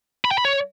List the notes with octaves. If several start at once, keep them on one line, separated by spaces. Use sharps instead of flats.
B5
G5
B5
C#5